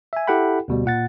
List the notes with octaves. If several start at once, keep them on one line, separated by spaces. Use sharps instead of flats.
E5 G#5
E4 G4 A4 F#5 G5 B5
D2 B2 G3
A#2 F#5 A6